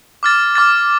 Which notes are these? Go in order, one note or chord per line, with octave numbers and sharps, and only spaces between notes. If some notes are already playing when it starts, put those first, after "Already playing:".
D6 F6 A6
D6 F6 A6